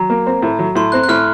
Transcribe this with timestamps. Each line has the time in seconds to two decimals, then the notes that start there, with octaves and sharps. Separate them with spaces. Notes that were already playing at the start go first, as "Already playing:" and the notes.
Already playing: F#3 A#5
0.10 A#3
0.27 C4
0.42 A2
0.59 F#3
0.75 A2 C6
0.92 C4 F#6
1.03 F#6
1.09 A2 F6